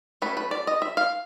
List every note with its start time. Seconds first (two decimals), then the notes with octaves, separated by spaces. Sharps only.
0.22 F#3 A3 C#4 B4
0.37 B4
0.51 D5
0.67 D#5
0.82 E5
0.97 F5